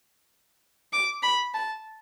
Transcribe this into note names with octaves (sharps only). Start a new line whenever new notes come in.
D6
B5
A5